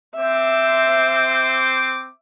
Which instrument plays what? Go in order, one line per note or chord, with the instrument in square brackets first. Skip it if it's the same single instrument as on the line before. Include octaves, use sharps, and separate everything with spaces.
[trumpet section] C4 C5 D6 [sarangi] E5